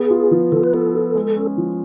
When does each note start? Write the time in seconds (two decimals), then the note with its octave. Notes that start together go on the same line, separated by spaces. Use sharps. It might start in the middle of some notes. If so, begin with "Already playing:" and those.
Already playing: B3 G#4
0.10 F4
0.31 F3
0.52 F3 A4
0.63 B4
0.73 B3 A4
0.94 F4
1.15 G#3
1.36 C#4
1.57 F3